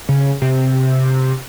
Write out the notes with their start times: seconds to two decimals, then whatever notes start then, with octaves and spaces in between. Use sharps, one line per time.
0.09 C#3
0.42 C3